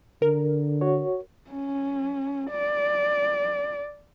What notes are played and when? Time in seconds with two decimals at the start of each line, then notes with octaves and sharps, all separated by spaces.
0.22 D3 A#4
0.81 F#4 C#5
1.50 C#4
2.50 D5